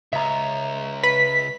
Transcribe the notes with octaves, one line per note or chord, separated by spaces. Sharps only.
C#2 E5 A#5
B4 B6